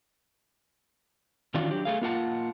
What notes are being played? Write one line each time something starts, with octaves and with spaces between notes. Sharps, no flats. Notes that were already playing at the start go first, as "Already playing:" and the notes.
D#3 E3 C#4 D4 F4 F#4
F#3 D4 G4
A3 G#4 F5
A#3 F4 F#5 A5